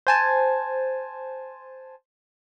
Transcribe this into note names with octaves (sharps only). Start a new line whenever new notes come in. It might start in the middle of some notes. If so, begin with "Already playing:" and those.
C5 G#5 A5